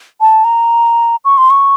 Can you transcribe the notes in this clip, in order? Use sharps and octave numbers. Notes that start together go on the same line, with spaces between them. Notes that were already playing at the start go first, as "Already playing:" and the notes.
A5
A#5
C#6
C6
C#6